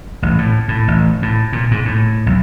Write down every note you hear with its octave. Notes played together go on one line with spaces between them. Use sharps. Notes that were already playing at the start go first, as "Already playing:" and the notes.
A1
A2
A2
A1
A2
A#2
G#2
A2
B1